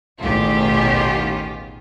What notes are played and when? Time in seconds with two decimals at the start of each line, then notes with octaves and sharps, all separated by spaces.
0.20 A1 D#2 B2 D#3 F4 G4 G#4